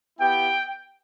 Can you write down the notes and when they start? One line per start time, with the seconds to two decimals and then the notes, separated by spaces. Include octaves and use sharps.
0.19 B3 E4 G4 G5